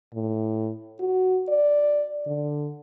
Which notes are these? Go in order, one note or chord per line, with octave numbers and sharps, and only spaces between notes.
A2
F#4
D5
D3